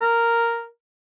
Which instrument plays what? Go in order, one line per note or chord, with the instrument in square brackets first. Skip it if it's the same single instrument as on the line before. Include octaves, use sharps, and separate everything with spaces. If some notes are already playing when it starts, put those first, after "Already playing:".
[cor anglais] A#4